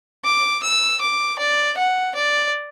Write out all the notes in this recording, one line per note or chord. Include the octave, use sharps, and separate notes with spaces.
D6
E6
D6
D5
F#5
D5